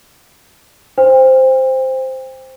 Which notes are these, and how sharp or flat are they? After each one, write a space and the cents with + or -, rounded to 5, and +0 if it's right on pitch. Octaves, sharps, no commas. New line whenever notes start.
C5 +0 G5 +35